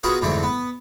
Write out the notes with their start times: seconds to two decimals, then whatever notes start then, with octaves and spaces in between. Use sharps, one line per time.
0.03 B3 F4 F#4 G#4 A#4
0.21 F2 G#2 D3 E3 A3 C4
0.43 B3